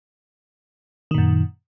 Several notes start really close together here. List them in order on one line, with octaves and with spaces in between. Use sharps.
D#3 A#2 F#2